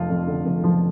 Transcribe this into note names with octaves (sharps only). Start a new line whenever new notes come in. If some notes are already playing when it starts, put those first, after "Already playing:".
Already playing: F1 F3 F4
F2
D3
F1
F3